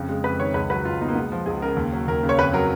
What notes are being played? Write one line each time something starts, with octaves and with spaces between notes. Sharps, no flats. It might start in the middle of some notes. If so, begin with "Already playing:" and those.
Already playing: F2 C#3
G#3
F2 B4
D#3 C#5
C#2 B4
F#3 B4
C#2 F4
B2 D#4
A#3
G#3 B3
F3
C#2 G#4
C#3 A#4
D#2
F#3
D#2 A#4
C#3
C#5
F2 B4
F#3 A#4